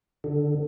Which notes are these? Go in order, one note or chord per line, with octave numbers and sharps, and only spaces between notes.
D3